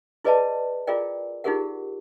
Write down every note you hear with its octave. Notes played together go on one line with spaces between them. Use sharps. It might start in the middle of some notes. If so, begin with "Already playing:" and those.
E4 G#4 B4 D5 D#5 A5
E4 F4 G#4 A#4 D5 G5
D#4 F4 G4 G#4 A#4 F#5